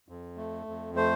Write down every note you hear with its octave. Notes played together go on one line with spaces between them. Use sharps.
F2
A3
F2
A3 C5